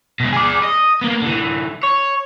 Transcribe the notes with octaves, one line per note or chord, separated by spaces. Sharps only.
B2 G#3
G#4 D5
D#5
A#3 B3
D3 E3
C#5